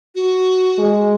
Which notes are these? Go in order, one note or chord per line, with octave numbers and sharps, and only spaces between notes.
F#4
G#3